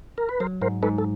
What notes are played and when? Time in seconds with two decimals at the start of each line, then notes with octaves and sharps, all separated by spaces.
0.18 A#4
0.29 B4
0.40 F#3 A#4 C5
0.61 G#2 A#4 C5
0.83 G#2 A4 B4
0.98 A4